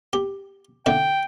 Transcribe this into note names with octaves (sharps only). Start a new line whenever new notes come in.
G4
D3 E4 G5